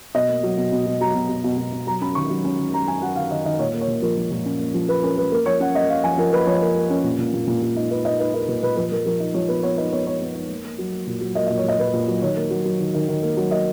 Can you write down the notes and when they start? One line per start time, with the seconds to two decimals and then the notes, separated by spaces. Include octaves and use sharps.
0.15 B2 D#5
0.28 A#3
0.43 F#3
0.57 B2
0.72 B2
0.86 B2
1.01 F#3 A#5
1.15 B2
1.29 B2
1.44 B2
1.58 B2
1.73 B2
1.87 F#3 A#5
2.02 C#4 B5
2.15 D#3 C#6
2.30 F#3
2.45 C#4
2.59 D#3
2.73 F#3 A#5
2.87 C#4 G#5
3.02 F#3 F#5
3.16 D#3 F5
3.31 D#3 D#5
3.45 D#3 D#5
3.59 A#2 C#5
3.74 A#3
3.81 C#5
3.88 A#2
4.02 F3 A#4
4.17 F3
4.31 A#2
4.46 C#4
4.60 A#3
4.74 F3
4.89 A#3 B4
5.03 C#4 A#4
5.18 F3 B4
5.32 A#3 A#4
5.46 F3 C#5
5.60 C#4 F#5
5.75 A#3 D#5
5.89 A#3 F5
6.04 F3 G#5
6.18 F3 A#4
6.32 A#3 B4
6.47 F3 C#5
6.61 A#3 A#4
6.75 A#3
6.90 C#4
7.04 A#2
7.19 A#2
7.33 A#2
7.47 A#2
7.62 A#2
7.76 D#4
7.91 D#4 B4
8.05 D#4 D#5
8.19 D#4 B4
8.34 D#4 A#4
8.49 A#2 B4
8.63 A#2 B4
8.77 F3 B4
8.92 F3 A#4
9.06 F3 A#4
9.20 D#4
9.34 F3 C#5
9.49 B3 B4
9.63 B3 C#5
9.78 D#4 B4
9.93 B3 C#5
10.06 B3 C#5
10.21 B3
10.35 D#4
10.49 A#3
10.64 A#3
10.78 F#3
10.93 A#3
11.07 A#2
11.21 F#3
11.35 A#3 D#5
11.47 D#5
11.50 A#2
11.58 C#5
11.64 A#2 D#5
11.79 A#2 B4
11.93 A#2
12.08 F#3
12.22 D#3 C#5
12.37 A#3
12.51 F#3
12.65 F#3
12.79 D#3
12.94 D#3
13.08 D#3
13.23 A#3
13.37 F#3
13.51 A#3 D#5